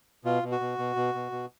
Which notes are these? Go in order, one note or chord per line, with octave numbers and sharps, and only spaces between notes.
B2 F4
B2
F#4
B2
B2
B2
B2
B2